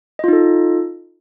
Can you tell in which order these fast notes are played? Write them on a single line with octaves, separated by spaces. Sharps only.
D#5 F4 D#4 A4